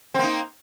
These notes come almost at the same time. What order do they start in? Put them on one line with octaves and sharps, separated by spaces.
C4 A#3 D#4